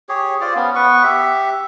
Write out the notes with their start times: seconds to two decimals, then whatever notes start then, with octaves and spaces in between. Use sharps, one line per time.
0.09 G4 G#4 C#5
0.41 F4 C5 D5
0.56 B3 C#4
0.75 B3 B4 C#6
1.04 G4 E5